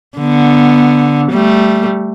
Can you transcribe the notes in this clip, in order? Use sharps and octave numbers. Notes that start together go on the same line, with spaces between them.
D3 B3
G3 A3